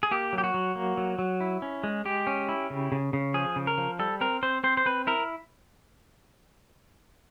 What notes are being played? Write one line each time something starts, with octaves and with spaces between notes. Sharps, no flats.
G#4
A#3 G4
F#3
G4
F#4
F#3
A#3
F#3
F#3
E4
C#4
G#3
G#3 G4
C#4
E4
C#3
C#3
C#3
F3 G#4
C#3
A#4
F3
G3 A4
C4 A#4
C4 C5
C4 C5
C5
C4 B4
E4 A#4